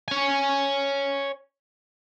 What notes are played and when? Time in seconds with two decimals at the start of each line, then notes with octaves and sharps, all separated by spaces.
0.08 C#5 G#5